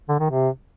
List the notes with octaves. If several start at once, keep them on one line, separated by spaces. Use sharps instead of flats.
D3
D#3
C3